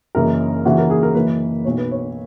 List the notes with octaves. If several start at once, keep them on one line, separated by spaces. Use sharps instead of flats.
F#1 F#2 C#3 E3 A#4
D#2 C#3 E3 F#4
A#4
G#4
A#4
F#1 F#2 E3 B4
B1 B2 C#5
B4
C#5